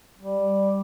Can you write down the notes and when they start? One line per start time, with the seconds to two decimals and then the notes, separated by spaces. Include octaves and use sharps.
0.18 G3